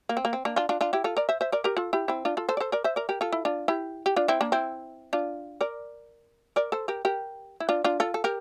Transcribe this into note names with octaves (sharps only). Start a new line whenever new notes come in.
A#3
C4
A#3
C4
A#3 D4
D4 F4
D4 F4
D4 F4
E4 G4
F4 A4
A#4 D5
C5 E5
C5 E5
A#4 D5
G4 A#4
F4 A4
E4 G4
C4 E4
D4 F4
F4 A4
A4 C5
D5
A4 C5
A#4 D5
C5 E5
A#4 D5
G4 A#4
F4 A4
E4
D4 F4
E4 G4
G4
D4 F4
C4 E4
A#3 D4
C4 E4
D4 F4
A#4 D5
A#4 D5
A4 C5
G4 A#4
G4 A#4
E4
D4 F4
D4 F4
F4 A4
A4
G4 A#4